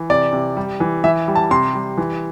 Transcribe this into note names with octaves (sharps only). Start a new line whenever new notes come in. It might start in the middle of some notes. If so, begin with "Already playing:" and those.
Already playing: E3
C3 D5
C3
G3
E3
E3 E5
G3
A5
C3 C6
G3
E3